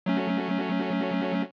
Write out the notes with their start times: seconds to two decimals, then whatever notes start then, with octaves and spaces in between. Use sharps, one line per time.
0.06 F#3 A3 C#4